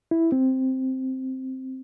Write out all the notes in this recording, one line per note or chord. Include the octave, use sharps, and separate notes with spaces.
E4
C4